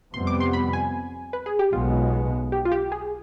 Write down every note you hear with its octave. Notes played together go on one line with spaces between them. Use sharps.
F2 C3 G3 B3 C6
D6
C6
B5
G#5
B4
G#4
G4
B1 B2 G#3 B3 F4
G4
F4
G4
G#4